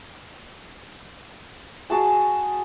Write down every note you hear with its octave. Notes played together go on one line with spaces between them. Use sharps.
F#4 G#4 A5